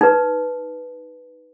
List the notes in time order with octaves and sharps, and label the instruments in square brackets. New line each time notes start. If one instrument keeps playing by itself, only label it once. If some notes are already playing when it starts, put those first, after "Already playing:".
[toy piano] D#4 B4